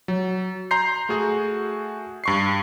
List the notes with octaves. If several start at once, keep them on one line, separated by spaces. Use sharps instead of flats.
F#3
A#5 C6 G6 C7
A3 F#4 G#4
G2 C#6 C7